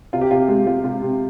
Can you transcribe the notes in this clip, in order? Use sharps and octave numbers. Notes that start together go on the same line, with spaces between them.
C3 F4
G4
C3 F4
G#3 G4
G#3 F4
C3 F4
C3